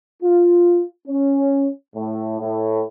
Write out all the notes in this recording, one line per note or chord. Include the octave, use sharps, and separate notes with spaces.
F4
C#4
A2
A2